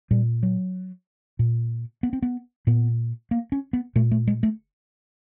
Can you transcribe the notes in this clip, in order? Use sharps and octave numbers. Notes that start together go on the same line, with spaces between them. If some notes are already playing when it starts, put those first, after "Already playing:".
A#2 G3
F#3
A#2
B3
C4
B3
A#2 B3
A#3
C#4
B3
A#2 A3
A3
G#3
A3